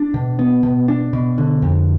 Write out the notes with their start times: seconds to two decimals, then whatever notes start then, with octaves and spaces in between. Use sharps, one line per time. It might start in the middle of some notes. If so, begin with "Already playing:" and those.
Already playing: D4
0.14 B2
0.39 B3
0.63 B2
0.88 D4
1.13 B2
1.38 D3
1.62 F2